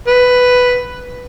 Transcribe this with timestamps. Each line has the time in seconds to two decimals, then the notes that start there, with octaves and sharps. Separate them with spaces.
0.07 B4